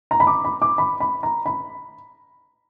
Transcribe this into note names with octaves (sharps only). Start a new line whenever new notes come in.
A#5
B5
D6
B5
D6
B5
B5
A#5
B5